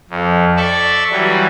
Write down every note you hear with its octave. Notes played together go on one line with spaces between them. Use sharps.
F2
A4 D5 E5 C#6 E6
E3 F#3 G3